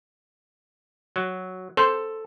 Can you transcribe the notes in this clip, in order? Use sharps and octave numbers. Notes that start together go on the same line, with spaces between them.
F#3
A4 C5